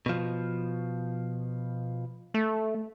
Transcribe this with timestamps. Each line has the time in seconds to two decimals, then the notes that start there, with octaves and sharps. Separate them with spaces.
0.06 B2 F3
2.34 A3